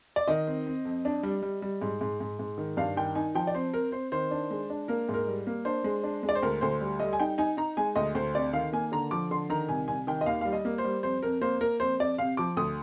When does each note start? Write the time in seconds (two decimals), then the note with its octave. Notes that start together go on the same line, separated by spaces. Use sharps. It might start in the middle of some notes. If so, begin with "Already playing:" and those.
0.16 D5
0.28 D#3 D#5
0.47 C4
0.67 C4
0.85 F2
1.05 D4
1.23 G3
1.42 G3
1.62 G3
1.82 G#2
2.01 G#2
2.20 G#2
2.39 G#2
2.58 D#3
2.77 G2 F5
2.97 D#3 G5
3.15 D#4 G#5
3.35 F3 G5
3.47 D5
3.54 C4 C5
3.74 C4 A#4
3.92 C4 C5
4.12 D#3 C5
4.31 D4
4.51 G#3
4.70 D4
4.88 A#3 A#4
5.09 G#2
5.14 A#4
5.28 G3
5.47 A#3
5.65 D4 C5
5.84 G#3
6.03 D4
6.23 G#3
6.29 D5
6.35 C5
6.42 D2 A#4
6.61 D2 C5
6.81 G3
7.00 G3 D#5
7.13 G#5
7.19 D#4 G5
7.38 D#4 G#5
7.57 D#4 A#5
7.77 G#3 G#5
7.96 D2 D#5
8.15 D2 C5
8.35 C3 D5
8.53 D#3 F5
8.73 A#3 G#5
8.92 D3 A#5
9.11 F3 D6
9.31 D3 C6
9.50 D#3 A#5
9.69 C2 G#5
9.88 C2 G#5
10.07 D#3 G5
10.21 D#5
10.26 D#2 F5
10.41 G3 F5
10.53 D#5
10.65 A#3
10.78 C5
10.84 G3
11.03 F2 C5
11.23 F2 A#4
11.42 A#3 C5
11.61 A#3 A#4
11.80 F2 C5
12.00 F2 D5
12.18 C3 F5
12.37 F3 D6
12.57 D2 D#6